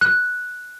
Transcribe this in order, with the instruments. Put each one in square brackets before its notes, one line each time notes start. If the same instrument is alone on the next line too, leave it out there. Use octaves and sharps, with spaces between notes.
[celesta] F#6